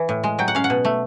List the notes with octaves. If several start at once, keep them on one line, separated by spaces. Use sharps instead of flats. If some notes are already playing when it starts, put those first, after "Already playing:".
Already playing: E3
A2
G#3
F#3 G5
F#5
C#4 F5
F#5
B2
A3